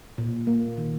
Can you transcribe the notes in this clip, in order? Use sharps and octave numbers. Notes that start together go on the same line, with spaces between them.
A#2
A#3
D#3